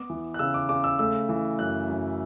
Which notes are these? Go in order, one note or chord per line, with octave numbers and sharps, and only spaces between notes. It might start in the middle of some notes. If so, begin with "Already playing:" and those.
Already playing: B3 D6
E3
F#6
C#3 E6
D6
C#3 D6
E6
A3 E6
E3
F#2 F#6
F#2